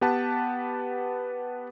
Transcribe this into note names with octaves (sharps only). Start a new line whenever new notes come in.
B3 G4 B4 F#5 A5